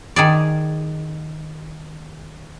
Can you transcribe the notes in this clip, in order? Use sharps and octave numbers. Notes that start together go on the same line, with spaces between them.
D#3 G#4 D5